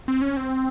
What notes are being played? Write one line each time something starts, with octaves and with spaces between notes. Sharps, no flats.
C4
C#4
C4